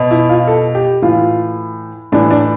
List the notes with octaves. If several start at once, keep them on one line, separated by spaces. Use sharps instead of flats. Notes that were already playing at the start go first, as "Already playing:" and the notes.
Already playing: B2
E4
F4
A4
G4
A2 E3 F4
A2 E3 D4
D4